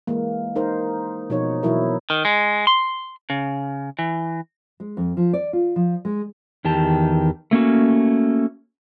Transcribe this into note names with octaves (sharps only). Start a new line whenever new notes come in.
E3 G#3 A#3
D#4 A#4 C5
B2 F3 D#4 C#5
B2 E3 F#3 E4 A#4
D#3
G#3
C6
C#3
E3
G#3
F2
F3
D5
F4
F3
G#3
E2 D#3 G4 A5
A3 A#3 C#4 F#4